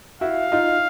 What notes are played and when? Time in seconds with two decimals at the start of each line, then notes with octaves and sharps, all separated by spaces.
0.21 E4 F#4 F5
0.52 D#4 F4